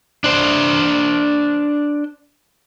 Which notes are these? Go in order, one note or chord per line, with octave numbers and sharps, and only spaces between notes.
D4 C5